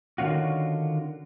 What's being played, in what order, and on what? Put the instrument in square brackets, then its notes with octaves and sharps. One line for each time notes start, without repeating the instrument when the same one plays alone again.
[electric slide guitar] D3 D#3 C#4 F4 F#4